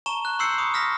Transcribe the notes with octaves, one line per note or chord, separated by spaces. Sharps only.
A5 A#5 C#6 E7 G7
F#6
C6 C#6 E6 G6 C7 C#7
B5 C#6 D#6
D#6 F6 A#6 B6